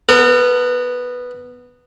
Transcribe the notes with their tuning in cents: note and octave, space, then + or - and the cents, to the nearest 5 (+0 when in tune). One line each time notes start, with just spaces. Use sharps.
B3 +0 A#4 -45